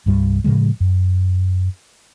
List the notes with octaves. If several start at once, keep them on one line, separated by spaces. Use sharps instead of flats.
C2 G2 G3
A2 C#3 F3 G#3
F#2